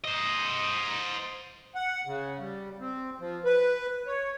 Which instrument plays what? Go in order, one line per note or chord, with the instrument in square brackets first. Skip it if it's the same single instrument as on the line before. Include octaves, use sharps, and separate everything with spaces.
[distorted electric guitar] C5 D#5
[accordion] F#5
C#3
G3
C4
F3
B4
C#5